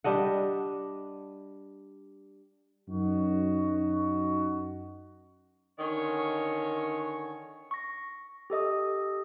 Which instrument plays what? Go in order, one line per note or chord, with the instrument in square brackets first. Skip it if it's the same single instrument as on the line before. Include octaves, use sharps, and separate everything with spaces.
[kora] G3 D4 D#5 F#5
[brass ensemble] F#2 D#4 F#4
[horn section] D3 D#3 C#4 C#5
[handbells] C#6 A#6
G4 A4 D#5 D#6